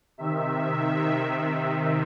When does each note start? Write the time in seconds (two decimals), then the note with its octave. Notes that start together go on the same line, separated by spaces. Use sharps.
0.18 C3 D#3 E5
0.96 C3 D#3